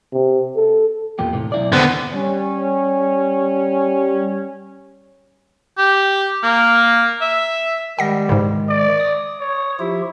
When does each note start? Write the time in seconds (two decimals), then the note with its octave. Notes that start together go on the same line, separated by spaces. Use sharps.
0.12 C3
0.56 A4
1.19 E2 A#2 G4
1.33 A2 C3
1.52 B1 E4 D5
1.72 E2 D3 B3 C4
2.13 G3 C#4
5.78 G4
6.43 A#3
7.21 E5
7.99 D#3 G3 G#3 F#5 A#6
8.29 G#2 C#3
8.69 D5
9.00 D#6
9.40 C#5
9.79 F3 E4 F4 G4